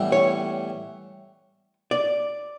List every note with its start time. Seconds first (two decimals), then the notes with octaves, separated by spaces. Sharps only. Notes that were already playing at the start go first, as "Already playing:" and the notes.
Already playing: A2 E3 G3 B3 E4
0.12 C#5
1.91 D5